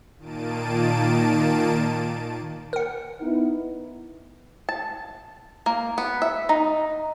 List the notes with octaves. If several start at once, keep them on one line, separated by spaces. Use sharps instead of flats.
A#2 D#3 A#3 A5 D7 D#7
A#4 F#5
B3 D#4 E4
A5
A#3
B3
E5
D#4